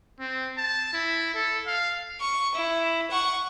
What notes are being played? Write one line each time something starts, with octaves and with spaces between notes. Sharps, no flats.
C4
A5
E4
A4
F5
C#6
E4
F#5 C#6